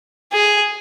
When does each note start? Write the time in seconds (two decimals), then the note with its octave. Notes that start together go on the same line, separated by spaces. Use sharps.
0.33 G#4